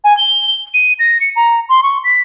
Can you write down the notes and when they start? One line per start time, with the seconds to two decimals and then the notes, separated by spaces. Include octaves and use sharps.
0.04 G#5
0.17 G7
0.74 D#7
0.99 A#6
1.20 C#7
1.36 A#5
1.69 C6
1.83 C#6
2.04 B6